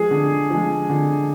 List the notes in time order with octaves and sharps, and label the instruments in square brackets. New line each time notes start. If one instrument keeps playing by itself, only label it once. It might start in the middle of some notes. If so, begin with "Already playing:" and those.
Already playing: [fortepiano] F3 G#3 [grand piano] G#4
[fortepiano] D3
F3 G#3
D3